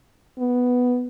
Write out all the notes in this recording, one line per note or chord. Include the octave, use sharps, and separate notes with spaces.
B3